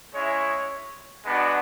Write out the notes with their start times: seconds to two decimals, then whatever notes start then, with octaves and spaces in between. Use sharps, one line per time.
0.13 G#3 C#4 E4 C#5
1.25 G#3 B3 D4 F#4